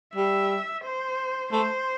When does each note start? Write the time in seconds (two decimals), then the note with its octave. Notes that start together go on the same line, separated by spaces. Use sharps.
0.14 G3 E5
0.84 C5
1.52 A3 C5